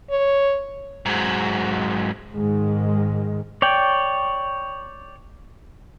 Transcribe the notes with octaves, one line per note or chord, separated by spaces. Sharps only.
C#5
G#2 F#3
G#2 D#3 G#3
C#5 D5 G5